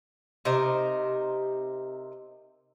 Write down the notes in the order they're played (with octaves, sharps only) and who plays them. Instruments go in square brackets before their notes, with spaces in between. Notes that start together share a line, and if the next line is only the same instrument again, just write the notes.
[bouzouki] C3 D#4 A#4 C5